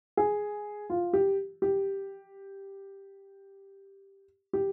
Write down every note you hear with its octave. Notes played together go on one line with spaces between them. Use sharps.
G#4
F4
G4
G4
G4